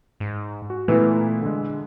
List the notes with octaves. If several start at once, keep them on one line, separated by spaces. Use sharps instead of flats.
G#2
F#4
A#2 E3 A3 B3 E4
D3 G#3